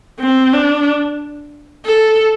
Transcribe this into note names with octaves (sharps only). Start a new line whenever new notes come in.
C4
D4
A4